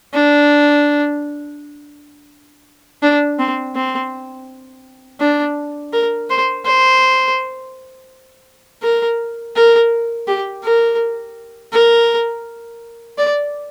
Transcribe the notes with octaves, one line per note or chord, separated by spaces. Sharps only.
D4
D4
C4
C4
D4
A#4
C5
C5
A#4
A#4
G4
A#4
A#4
D5